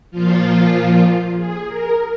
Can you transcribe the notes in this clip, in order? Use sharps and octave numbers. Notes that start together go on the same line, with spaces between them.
A#2 F3 F4
G#4
A#4